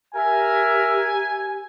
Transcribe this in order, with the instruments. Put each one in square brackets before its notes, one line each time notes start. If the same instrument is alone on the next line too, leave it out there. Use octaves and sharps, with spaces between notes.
[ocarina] G4 [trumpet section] A#4 E5 [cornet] G#5